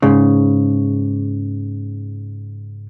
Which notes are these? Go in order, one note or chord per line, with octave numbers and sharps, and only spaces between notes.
G#2 C#3